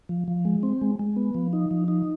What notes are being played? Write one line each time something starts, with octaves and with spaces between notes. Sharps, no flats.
F3
F3
G#3
C4
G#3
G#3
B3
F3
D#4
F3
D#4